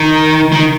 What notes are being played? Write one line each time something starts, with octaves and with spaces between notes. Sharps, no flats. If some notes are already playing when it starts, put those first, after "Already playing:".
Already playing: D#3
D#3